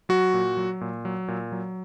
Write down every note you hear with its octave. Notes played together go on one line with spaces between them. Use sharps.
F#3 F#4
A#2
F#3
A#2
F#3
A#2
F#3